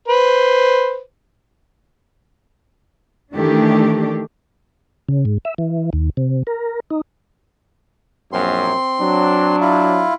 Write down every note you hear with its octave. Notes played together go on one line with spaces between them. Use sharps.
B4 C5
D#3 E3 A3 D4 G4
C#3
G#2
E5
E3
D#2
C3
A#4
D#4
A#1 F#2 C4 C6
F#3 D4
E4 F4